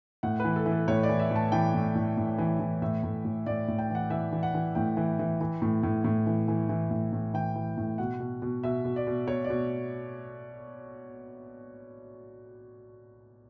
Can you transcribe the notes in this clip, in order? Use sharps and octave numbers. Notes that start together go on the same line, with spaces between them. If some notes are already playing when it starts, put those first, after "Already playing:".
A2 F#5
E3 B4
A4
E3
A4
A2 C#5
D5
E3
E5
A2 A5
E3 G5
A2
A2
A2
E3
E3
A2 E5
A2
A2
A2 D5
A2
G5
E3 F#5
E3 E5
E3
F#5
E3
A2 G5
E3
E3
E3
A2
A2
A2
E3
E3
E3
A2
A2
E3 G5
E3
A2
B2 F#5
B2
B2
B2 E5
B2
D5
B2
B2 C#5
D5
B2